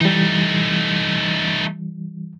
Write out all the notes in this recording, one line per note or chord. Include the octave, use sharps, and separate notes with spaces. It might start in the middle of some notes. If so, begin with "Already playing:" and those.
E3 G3 A3 D#4